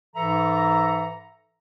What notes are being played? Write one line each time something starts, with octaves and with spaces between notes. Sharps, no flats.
G#2 E3 A4 E5 A#5